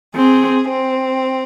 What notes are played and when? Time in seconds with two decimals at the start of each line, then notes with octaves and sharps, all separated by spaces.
0.15 C4 G#4
0.69 C4